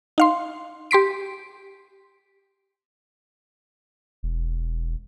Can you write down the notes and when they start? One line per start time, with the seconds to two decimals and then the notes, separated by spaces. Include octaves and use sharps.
0.18 D#4 F5 C6
0.91 G4 C6 B6 D7
4.23 E1